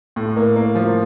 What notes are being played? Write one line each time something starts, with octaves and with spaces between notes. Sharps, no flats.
A2
A#3
A#3
F3